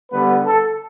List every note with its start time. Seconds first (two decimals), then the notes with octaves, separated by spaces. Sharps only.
0.11 D3 G3 B3 B4
0.46 A4